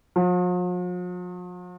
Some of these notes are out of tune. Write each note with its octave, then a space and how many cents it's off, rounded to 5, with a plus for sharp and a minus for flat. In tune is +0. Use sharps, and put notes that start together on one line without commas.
F3 +45